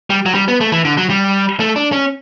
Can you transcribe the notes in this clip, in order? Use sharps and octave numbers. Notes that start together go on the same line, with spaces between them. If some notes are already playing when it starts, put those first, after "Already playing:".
G3
F#3
G3
B3
A3
E3
D3
F#3
G3
A3
D4
C#4